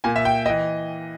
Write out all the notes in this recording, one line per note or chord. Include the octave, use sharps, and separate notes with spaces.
A#2 G#5
E5
G5
E3 D#5